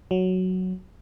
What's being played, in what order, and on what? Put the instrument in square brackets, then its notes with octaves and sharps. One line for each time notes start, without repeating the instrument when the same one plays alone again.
[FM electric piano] F#3